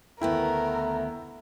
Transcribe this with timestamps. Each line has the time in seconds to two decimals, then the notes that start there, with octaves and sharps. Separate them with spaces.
0.21 D2 D#3 A3 B3 E4 A#4 G5